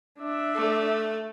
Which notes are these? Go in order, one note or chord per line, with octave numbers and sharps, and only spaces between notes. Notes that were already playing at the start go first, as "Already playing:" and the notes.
D4 E5
A3